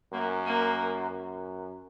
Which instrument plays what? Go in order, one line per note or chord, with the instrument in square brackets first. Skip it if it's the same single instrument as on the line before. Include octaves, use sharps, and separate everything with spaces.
[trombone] F#2 [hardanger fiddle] A#3
[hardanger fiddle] A#3
[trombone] F#2